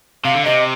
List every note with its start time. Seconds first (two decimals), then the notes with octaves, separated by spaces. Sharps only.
0.25 C3 F5
0.35 D3
0.45 C3 D#5